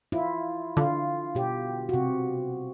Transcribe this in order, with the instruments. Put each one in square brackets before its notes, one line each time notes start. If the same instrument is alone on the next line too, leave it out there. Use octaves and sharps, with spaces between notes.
[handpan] E4 F4
[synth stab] D3 [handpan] F4
[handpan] B2 G4
C3 F#4